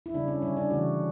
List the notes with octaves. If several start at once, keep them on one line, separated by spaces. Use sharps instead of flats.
E4
C#3 G3 D4
C#4
D3 G3 C#4
D4
C#3 E3 A3 F#4